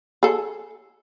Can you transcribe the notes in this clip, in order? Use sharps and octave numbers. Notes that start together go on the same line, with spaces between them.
G#4 A4